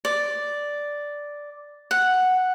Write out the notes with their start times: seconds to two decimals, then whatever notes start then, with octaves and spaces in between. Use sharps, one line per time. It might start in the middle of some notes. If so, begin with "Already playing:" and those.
0.05 D5
1.91 F#5